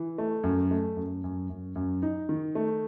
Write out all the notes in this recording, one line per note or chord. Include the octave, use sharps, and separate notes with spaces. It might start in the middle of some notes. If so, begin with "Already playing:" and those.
Already playing: E3
A3
F#2
A3
F#2
F#2
F#2
F#2
D#4
D#3
A3